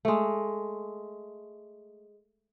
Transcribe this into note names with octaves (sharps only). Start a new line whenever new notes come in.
G#3 A3